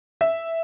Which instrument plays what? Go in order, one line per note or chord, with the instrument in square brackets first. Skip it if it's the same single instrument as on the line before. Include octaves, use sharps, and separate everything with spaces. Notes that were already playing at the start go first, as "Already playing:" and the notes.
[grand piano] E5